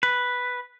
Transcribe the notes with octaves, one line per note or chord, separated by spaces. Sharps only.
B4